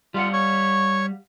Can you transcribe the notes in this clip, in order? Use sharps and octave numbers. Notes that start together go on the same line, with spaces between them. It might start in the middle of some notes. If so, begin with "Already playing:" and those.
G3 F4 F5 F#5
C#5 C#6